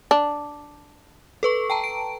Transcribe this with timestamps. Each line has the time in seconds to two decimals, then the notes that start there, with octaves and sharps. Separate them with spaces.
0.11 D4
1.43 A4 B4 C#6
1.70 G5 A5 A#5
1.84 D7